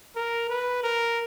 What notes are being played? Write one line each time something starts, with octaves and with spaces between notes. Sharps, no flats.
A#4
B4
A#4